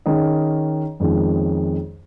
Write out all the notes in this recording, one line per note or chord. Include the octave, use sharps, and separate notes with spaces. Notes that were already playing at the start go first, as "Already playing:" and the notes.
D#3 C#4 G#4 D#5
F2 D#3 G#3 C#4